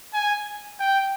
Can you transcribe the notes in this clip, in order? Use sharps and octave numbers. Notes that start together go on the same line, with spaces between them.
G#5
G5